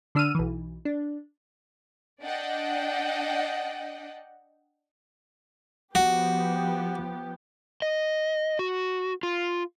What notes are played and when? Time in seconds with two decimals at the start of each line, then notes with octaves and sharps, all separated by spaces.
0.15 D3 D4 E6 F6 D#7
0.35 B1 E3
0.85 D4
2.22 D4 D5 D#5 F#5 G5
5.95 F3 B3 F#4 G4
7.82 D#5
8.59 F#4
9.23 F4